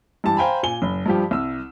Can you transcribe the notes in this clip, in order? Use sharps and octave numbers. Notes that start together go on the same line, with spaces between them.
G2 E3 G4 A5
C5 F5 G5 G#5 A#5 B5
A#2 G#5 G7
F#1
G2 F3 G4
C2 E6